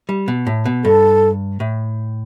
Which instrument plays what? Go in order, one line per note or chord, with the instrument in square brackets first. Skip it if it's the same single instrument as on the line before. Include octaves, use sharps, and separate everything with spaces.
[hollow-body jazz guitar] G3
B2
A2
B2
[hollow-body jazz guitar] G2 [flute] A4
[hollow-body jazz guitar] A2